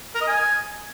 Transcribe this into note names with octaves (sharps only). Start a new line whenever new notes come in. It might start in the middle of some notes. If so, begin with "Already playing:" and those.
A#4
D#5
G#5